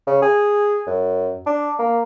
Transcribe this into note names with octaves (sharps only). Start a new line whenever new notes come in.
C#3
G#4
F#2
D4
A#3